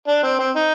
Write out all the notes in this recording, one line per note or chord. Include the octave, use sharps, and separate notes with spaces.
D4
C4
C4
D#4